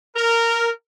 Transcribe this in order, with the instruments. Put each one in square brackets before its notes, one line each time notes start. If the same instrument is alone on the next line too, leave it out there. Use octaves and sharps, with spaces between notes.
[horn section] A#4